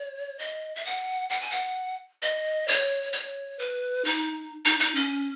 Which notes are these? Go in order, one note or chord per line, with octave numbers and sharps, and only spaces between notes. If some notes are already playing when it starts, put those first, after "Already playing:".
Already playing: C#5
D#5
E5
F#5
F#5
G#5
F#5
D#5
C#5
C#5
B4
D#4
D#4
D#4
C#4